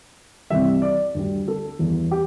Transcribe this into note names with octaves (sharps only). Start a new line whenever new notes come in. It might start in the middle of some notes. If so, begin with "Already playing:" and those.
C2 C3 E3 G3 E5
D5
D2 D3 G3
A4
E2 E3 G3
G4